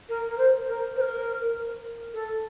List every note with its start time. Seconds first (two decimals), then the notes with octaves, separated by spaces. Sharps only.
0.09 A#4
0.28 A#4
0.38 C5
0.67 A#4
0.96 C5
1.01 A#4
2.13 A4